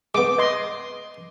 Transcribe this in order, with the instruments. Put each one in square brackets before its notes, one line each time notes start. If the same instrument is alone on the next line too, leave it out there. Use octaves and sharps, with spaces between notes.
[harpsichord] G#3 B3 [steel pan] D6
[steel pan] D#5 C6